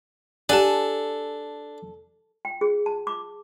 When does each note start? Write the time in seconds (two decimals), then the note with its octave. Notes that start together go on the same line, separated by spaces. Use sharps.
0.49 D4 G4 A4 F#5 G#5 A5 F#6
2.45 G5
2.61 G#4
2.86 A5
3.07 D6